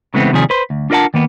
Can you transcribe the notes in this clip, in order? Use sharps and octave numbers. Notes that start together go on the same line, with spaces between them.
C#3 E3 G#3 A3 B3 C4
D#2 C3 D#3 F3 G3 G#4
B4 C5
D2
D4 F4 A#4 D5 F#5 A5
D#3 A#3 B3